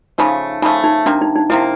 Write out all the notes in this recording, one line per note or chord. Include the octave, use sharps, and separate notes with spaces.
C#3 F3 A3 D#4
C#3 F3 A3 D#4
D#4
C3 F3 A#3 D4
D#4
D#4
C3 F3 A#3 E4